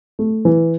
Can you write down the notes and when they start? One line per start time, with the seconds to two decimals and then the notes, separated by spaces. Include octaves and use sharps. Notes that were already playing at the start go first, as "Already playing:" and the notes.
0.19 A3
0.45 E3